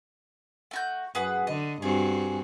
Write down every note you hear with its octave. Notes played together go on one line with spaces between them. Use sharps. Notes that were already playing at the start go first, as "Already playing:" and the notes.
A3 F#4 G6
F#2 G#4 B4 F#5
D3 D#5
G2 C4 F#4 G#4